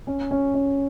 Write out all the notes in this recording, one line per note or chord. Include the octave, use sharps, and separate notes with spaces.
C#4
C#4
C#4